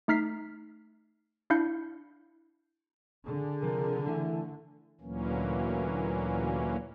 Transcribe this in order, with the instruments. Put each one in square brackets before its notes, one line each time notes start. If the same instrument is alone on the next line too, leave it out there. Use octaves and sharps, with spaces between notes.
[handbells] A3 D#4 F6 B6 C7
D4 E4 F5 G6 C7 C#7
[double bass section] D3 [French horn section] G#4
[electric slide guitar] C3 F3 [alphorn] A#4
[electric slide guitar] E3 E4 G#5 [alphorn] A3
[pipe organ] D2 A#2 E3 F#3 A#3 C#4